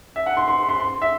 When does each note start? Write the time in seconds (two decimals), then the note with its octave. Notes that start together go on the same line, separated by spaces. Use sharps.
0.16 E5
0.26 F#5
0.37 C6
0.48 C6
0.58 C6
0.69 C6
0.80 C6
1.02 E5